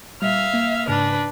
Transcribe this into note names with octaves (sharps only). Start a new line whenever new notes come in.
A#2 G3 E5 F5 F6
A#3
G#2 C#3 D4 B4